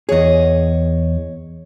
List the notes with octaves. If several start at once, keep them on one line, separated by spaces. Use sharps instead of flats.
E2 G#4 C#5 D#5